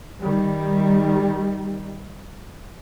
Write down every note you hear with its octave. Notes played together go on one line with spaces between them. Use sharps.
D#3 G3